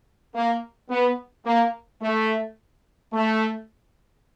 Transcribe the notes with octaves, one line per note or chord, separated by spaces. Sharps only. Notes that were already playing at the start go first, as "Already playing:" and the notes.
A#3
B3
A#3
A3
A3